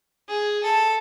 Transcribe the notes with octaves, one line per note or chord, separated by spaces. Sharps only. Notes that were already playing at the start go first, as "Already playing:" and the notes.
G#4
A4